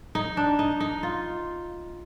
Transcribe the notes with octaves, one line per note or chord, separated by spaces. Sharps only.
D#4
D4
D#4
D#4
F4